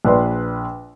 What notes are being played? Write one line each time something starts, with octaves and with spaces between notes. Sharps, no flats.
A#1 B4 D5 C6